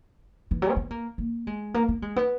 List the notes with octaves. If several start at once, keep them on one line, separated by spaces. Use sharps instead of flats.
E3
F#3
C#4
B3
A#3
A#3
G#3
A#3
B3
G#3
B3